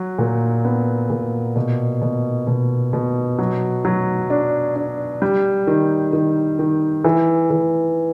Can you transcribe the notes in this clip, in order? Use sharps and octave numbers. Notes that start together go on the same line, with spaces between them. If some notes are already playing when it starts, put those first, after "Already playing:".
Already playing: F#3
A#2
B3
A#2
B2
B2
B2
B2
F#3
F#3
D4
D4
G3
D#3
D#3
D#3
E3
E3